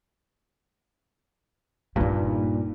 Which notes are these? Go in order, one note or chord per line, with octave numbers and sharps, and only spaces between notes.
G2 A#2 A#3 D#4